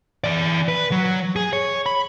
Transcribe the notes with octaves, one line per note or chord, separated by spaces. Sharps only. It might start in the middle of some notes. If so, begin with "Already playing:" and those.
E3 D5
B4
F#3
G#4
C#5
B5